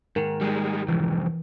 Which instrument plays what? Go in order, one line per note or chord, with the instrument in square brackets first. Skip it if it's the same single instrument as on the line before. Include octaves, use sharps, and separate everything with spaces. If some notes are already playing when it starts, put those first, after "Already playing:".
[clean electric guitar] G#2 D#3 [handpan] A#4
[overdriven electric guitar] G3 G#3
[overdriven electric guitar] C2 F2 [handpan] E3